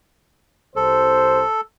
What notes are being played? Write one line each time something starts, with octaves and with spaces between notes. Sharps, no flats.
C2 A4 C5